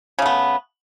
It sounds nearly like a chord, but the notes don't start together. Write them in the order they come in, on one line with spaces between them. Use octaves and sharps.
C#3 A3 B3